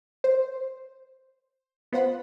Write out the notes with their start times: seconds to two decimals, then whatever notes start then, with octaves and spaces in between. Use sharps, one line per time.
0.24 C5
1.93 B3 F4 C5 F#5 B5